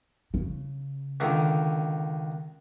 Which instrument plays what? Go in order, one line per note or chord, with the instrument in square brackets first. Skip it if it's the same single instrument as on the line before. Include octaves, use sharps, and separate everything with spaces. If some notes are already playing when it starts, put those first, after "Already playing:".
[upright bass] C#3
[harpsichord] C#2 D3 D#3